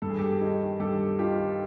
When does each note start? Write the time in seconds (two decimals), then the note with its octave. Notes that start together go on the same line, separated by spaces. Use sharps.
0.02 G2 A4
0.10 G#4
0.18 G4 A4
0.41 D#3
0.80 G2 G4 A4
1.19 D#3 F4 G4